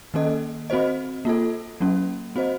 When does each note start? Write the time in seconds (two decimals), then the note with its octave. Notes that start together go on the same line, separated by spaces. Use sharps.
0.14 D#3 A#3 C#4 A4 D#5
0.70 C4 F#4 C5 D#5
1.25 A#3 F4 A4
1.80 F#3 A#3 C#4
2.36 C4 F#4 C5 D#5